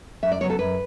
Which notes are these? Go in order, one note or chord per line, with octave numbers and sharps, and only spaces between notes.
F#2 E5
D5
C#3 F#3 B3 C#5
A4
F#2 B4